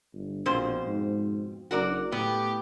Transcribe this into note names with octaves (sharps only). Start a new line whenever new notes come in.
G1
A#1 F2 B2 C5
G#2
F#1 F#4 A#4 D5
A2 B3 G4